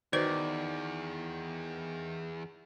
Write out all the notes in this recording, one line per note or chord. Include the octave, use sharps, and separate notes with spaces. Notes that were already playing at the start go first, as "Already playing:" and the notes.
E2 D#3 F#4 B4 C5 D5